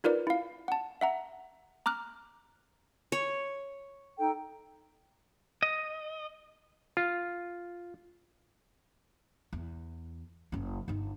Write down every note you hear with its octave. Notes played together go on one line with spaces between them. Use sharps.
D#4 F4 A#4 B4 D5
E4 F5
F#5 A5
E5 F#5 A#5
A#5 D6 F6 F#6
C#5
D#4 A4 G5
D#5
F4
E2
F#1 C#4
G1 D#4